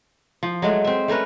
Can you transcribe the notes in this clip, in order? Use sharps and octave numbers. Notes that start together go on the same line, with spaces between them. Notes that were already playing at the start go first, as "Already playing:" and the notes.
F3
F#3 G#3 A3
C4 E5
A3 C#4 A#4 B4